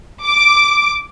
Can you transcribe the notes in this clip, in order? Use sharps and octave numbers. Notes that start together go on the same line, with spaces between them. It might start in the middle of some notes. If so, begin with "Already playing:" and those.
D6